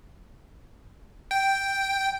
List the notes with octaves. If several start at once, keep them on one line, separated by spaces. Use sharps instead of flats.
G5